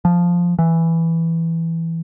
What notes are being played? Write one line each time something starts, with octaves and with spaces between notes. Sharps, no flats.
F3
E3